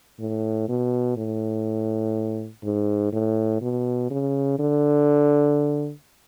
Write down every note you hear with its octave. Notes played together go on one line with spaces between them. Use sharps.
A2
B2
A2
G#2
A2
B2
C#3
D3